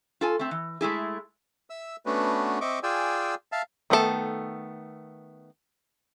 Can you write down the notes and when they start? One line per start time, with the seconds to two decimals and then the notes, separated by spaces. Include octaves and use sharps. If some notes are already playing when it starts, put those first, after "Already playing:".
0.21 F4 A4 G#5
0.39 A3 C4
0.51 E3
0.81 G#3 A3 E4 G#4
1.70 E5 E6
2.06 A3 B3 C#4 D4 F#4 B4
2.61 C4 D#5 E5 C#6 D6
2.83 F4 G#4 D5 G5 G#5 E6
3.52 E5 F5 A5
3.90 D#3 A3 B3 D4 A4